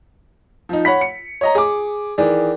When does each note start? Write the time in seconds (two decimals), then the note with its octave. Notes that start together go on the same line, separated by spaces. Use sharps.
0.69 F3 D#4
0.85 C#5 F#5 B5 B6
1.01 C#7
1.41 C#5 D#5 A#5
1.55 G#4 D6
2.18 D#3 E3 G#4 D5